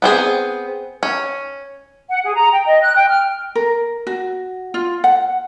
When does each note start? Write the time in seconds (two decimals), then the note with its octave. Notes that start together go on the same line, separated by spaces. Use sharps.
0.02 B3 C4 G#4
1.03 C#4
2.09 F#5
2.23 G#4
2.36 A#5
2.52 G5
2.66 D#5
2.82 F#6
2.95 G5
3.09 F6
3.55 A#4
4.07 F#4
4.74 F4
5.04 F#5